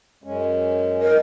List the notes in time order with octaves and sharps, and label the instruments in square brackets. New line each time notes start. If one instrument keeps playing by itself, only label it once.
[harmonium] F#2 G#3 C#4
[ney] A#4 [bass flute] D#5